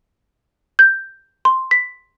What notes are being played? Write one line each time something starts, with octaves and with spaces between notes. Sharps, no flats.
G6
C6
B6